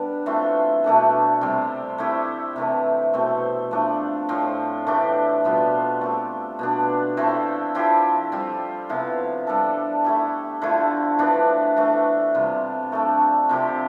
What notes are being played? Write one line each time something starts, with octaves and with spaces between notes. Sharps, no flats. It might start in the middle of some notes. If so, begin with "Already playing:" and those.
Already playing: G3 B3 D4
E3 A3 C4 F4
B2 A3 D4 A4
C3 G3 C4
A3 C4 E4 G4
C3 E3 A3 C4
B2 A3 C4
F3 A3 D4
A2 F3 C4
E3 A3 D4 G4
B2 G3 B3 F4
A3 C4 G4
B2 B3 D4
F3 A3 C4 E4
F3 C4 E4 G4
G3 C4 F4
C3 F3 B3 E4
G3 D4 A4
A3 E4 G4
D3 F3 A3 E4
E3 B3 D4
E3 A3 D4
C3 G3 C4 F4
A3 D4 A4
C3 F3 C4 G4